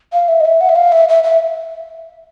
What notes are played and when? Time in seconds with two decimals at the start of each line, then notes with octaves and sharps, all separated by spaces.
0.13 F5
0.28 E5
0.40 D#5
0.45 E5
0.61 F#5
0.69 E5
0.76 F5
0.92 E5
1.09 E5
1.24 E5